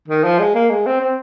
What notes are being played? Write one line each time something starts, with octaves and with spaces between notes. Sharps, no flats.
D#3
F3
G#3
A#3
G#3
C4
C4